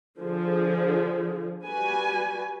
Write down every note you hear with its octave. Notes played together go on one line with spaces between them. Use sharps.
D3 F3 G#4
G3 F#4 B4 G#5